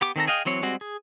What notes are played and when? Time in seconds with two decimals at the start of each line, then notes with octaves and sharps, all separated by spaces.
0.01 B3 G4 D6
0.16 D#3 C4 A4 A#5
0.27 G#4 D#5 F5 G5
0.45 E3 F#3 C4 C#5
0.63 G3 G#3 C4 F#4
0.81 G#4